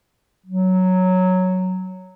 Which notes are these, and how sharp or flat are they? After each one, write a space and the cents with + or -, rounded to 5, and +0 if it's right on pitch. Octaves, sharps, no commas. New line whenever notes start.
F#3 +0